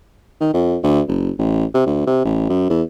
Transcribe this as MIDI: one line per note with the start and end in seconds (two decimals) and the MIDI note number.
0.40 0.50 51
0.54 0.76 41
0.83 1.00 38
1.08 1.31 30
1.39 1.65 33
1.74 1.85 48
1.86 2.02 38
2.07 2.20 48
2.25 2.45 33
2.49 2.68 42
2.70 2.82 40